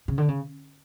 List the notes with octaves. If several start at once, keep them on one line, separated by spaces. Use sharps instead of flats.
C#3
D3
C#3